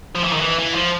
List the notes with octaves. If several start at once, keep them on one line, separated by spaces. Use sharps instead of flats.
F3
E3
D#3
E3
E3
F3